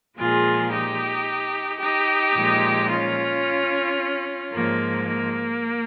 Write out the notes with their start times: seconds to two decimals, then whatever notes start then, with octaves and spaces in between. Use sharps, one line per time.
0.18 A#2 F3 G#3 F4 G#4
0.72 D#4 G4
1.80 D#4 G4
2.36 A#2 F3 G#3
2.90 C#4 F4
4.53 G#2 F3 G#3 A#3
5.07 A#3